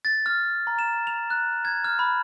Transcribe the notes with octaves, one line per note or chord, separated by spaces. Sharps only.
A6
F6
A#5
E7
F7
F#6
G#6
F6
B5